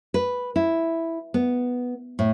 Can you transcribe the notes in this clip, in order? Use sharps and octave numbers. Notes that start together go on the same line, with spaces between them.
B4
E4
B3
A2